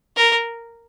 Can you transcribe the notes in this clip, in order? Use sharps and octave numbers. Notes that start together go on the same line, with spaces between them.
A#4